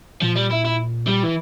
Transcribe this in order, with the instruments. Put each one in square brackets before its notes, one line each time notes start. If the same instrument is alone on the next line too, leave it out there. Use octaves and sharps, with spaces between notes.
[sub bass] A#2 [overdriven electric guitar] F3
[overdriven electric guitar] G3
E4
E4
G3
E3